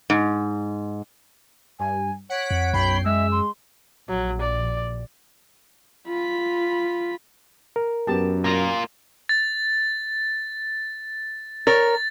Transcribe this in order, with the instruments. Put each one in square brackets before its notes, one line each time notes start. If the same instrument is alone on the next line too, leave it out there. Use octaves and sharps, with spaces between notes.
[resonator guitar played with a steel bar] G#2
[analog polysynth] G2 [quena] G#5
[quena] C#5 [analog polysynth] F#5 B6 D7
[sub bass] F2
[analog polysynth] B1 G5 C7 [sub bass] F#2 [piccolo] B5
[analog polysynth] G#3 [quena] E5 [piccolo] E6
[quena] C6
[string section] A#1 [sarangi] F#3
[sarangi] D5
[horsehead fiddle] F4 B5
[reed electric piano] A#4
[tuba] F#2 [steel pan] B3 G4 A5
[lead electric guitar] A#3 F4 [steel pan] A#5
[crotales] A6
[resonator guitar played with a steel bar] A#4 C#5 [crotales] A6